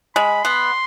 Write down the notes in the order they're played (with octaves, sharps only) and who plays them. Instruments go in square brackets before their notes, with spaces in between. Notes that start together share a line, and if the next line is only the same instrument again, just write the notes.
[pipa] G#3 [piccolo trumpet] B5
[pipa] B3 [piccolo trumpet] C6